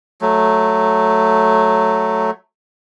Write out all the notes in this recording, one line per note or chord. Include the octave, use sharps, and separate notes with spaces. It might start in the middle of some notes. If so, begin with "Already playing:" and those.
F#3 A3